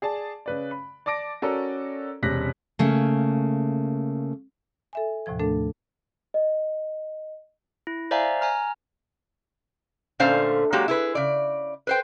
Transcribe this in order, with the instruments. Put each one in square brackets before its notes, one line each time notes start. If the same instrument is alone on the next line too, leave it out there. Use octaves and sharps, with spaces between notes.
[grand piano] G#4 D5 A5
C#3 B4 D5
B5
D5 A5 D6 A#6 D7
C#4 F#4 A4 A#4 D5 A#5
E1 C3 C#4 F#6 A#6 B6
[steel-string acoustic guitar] C#3 A3 A#3
[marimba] A4 E5 G#5
D#2 A2 C3 F3 G#6
A3 D4 A4 A#4
[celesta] D#5
[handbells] E4
C5 D5 E5 F5 G#5 A#5
G#5 A#5 F6
[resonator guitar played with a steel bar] A#2 D3 A3 C#4 C5 F5
F#3 G#3 A#3 F#4 G4
E4 G#4 B4
C#3 D5
B4 C5 G5